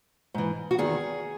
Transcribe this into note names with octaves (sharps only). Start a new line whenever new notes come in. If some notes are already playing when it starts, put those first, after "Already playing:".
G#2 E3
F#4
E2 D#3 G#4